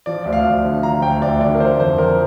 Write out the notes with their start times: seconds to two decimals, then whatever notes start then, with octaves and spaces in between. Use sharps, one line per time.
0.06 F3 D5
0.24 D2 D5
0.33 F5
0.45 D2
0.64 D3
0.83 F3 A#5
1.02 D2 G5
1.22 D2 D5
1.41 D3 D5
1.55 A#4
1.60 F3 C5
1.80 F2 C5
1.98 F2 A#4